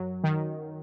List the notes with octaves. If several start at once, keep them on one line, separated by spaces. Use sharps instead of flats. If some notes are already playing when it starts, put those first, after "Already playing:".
Already playing: F#2 F#3
D#3